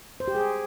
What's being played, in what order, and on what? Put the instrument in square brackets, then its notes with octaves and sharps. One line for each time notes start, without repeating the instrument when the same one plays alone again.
[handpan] C5
G4
G#4